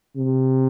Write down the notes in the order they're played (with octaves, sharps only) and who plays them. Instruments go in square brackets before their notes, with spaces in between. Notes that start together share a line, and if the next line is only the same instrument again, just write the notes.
[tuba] C3